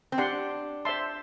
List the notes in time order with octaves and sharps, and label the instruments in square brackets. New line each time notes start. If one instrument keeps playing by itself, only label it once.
[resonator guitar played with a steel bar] C4
[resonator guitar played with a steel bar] D4 [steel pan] G4 D5 F#5 C6
[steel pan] C5 E5 A5 C6